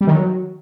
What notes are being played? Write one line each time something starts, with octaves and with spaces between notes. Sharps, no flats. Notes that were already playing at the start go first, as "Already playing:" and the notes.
G3
D#3
F#3